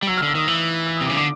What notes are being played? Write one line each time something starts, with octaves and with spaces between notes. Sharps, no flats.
G3
F#3 E6
F6
D3
E6
D#3 D#6
E3 E6
E6
D#6
C3
D6
C#3
D3 D6